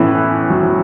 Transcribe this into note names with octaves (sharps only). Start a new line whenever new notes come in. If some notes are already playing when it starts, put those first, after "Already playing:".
Already playing: A2 E3 B3 C#4
F#3
F#3